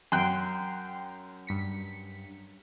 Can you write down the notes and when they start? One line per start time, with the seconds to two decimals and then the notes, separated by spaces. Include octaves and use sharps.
0.12 F#2 G5 C6 F#6
1.47 G2 B6 C#7